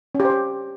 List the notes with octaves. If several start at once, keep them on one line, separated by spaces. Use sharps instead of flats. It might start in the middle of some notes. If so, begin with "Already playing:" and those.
C#4
G4
C5
G4